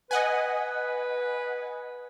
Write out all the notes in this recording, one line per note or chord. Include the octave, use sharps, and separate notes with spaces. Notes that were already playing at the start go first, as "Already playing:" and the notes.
B4 D#5 F#5 G#5